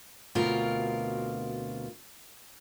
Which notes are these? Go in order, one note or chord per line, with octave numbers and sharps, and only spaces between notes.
D2 B2 C4 F4 A#4